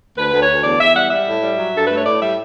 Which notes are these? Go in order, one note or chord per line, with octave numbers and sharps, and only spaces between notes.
D2 B4
D2
C#5
D2
E2 D5
E2 E5
G3 F#5
G3 E5
A2
G3
F#3
G2 A4
A3 B4
C#5
A2 D5
G3 E5